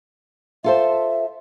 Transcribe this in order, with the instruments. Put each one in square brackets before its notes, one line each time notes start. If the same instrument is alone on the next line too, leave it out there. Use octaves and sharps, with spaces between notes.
[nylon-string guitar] F4 A4 C5 [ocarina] E5